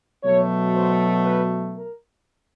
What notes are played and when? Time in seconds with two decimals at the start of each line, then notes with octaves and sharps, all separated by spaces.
0.23 B2 F#3 A3 C#5
0.74 C5
1.24 B4
1.75 A#4